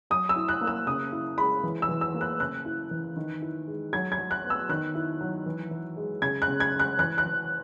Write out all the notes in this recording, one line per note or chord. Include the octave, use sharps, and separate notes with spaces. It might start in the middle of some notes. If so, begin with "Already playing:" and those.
F#3 D#6
E6
E4
F#6
A#3
E6
C#3 D#6
E4
G#3 B5
E3
E6
E3
E6
A#3
F#6
C#3 F#6
E4
E3
D#3
E4
G#3
F#3 G#6
G#6
F#3
F#6
B3
E6
D#3 F#6
E4
F#3
E3
E3
G#3
C#3 G#6
F#6
C#3
G#6
G#3
F#6
E3 F#6
F#6
E3